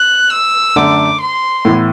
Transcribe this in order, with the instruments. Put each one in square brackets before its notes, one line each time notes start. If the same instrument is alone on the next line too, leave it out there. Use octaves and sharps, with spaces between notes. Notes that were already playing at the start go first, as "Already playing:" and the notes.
Already playing: [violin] F#6
E6
[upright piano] F#2 D3 A3 D4 A4 [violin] D6
[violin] C6
[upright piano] A2 E3 B3 E4